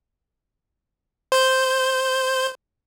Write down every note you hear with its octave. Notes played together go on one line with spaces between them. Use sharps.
C5 G6